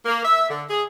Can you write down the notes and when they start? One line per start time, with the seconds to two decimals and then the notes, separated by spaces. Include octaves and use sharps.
0.05 A#3
0.24 E5
0.50 D3
0.69 G#4